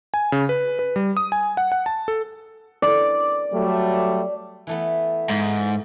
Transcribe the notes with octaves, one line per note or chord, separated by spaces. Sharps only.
G#5
C#3
B4
B4
G3
D#6
G#5
F#5
F#5
A5
A4
D5
F#3 G3 A3
E3 A3 B3
G#2